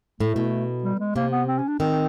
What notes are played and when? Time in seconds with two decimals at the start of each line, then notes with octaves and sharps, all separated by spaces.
0.20 A2 A3
0.36 B2
0.84 G3
1.00 G#3
1.15 C3 A#3
1.32 B3
1.48 C4
1.59 C#4
1.68 D4
1.80 D#3 C4